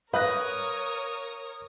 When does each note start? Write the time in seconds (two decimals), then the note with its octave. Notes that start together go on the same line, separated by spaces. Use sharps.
0.14 A#4 B4 C#5 F5 D#6 F#6 A#6